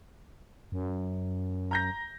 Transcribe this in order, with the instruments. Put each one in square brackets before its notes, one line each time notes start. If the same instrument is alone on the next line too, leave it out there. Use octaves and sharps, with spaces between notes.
[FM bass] F#2
[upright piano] A#5 G6 A#6